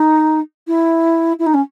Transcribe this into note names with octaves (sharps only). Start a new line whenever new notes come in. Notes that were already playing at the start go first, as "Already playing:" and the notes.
Already playing: D#4
E4
E4
D#4
C#4